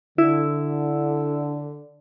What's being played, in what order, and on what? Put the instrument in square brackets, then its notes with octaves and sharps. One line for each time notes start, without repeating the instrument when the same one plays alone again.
[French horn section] D3 [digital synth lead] E4